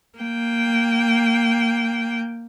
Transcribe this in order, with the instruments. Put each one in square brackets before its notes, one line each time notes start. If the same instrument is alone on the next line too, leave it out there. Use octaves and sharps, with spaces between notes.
[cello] A#3 G5